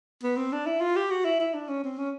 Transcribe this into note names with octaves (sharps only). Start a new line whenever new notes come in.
B3
C4
D4
E4
F4
G4
F#4
E4
E4
D4
C#4
C4
C#4